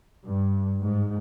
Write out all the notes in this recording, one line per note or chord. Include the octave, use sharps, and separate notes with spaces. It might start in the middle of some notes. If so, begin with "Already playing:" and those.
G2
G#2